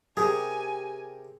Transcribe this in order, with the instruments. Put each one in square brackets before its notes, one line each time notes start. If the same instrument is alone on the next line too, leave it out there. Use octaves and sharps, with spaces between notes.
[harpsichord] C3 G4 A#4 [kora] G#4 [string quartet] G#5